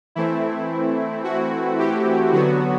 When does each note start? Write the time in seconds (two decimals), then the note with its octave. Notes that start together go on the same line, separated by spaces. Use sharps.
0.15 E3 A3 C4 E4
1.24 F#4
1.79 G4
2.33 D3 F#3 B3 F#4